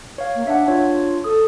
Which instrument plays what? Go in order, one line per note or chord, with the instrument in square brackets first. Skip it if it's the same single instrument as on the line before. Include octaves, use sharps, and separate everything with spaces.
[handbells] C#5 F5
[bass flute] A#3
[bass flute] D4 [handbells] E5 F#5
[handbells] D4 C#5 [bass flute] F4
[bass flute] A4 [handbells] D#6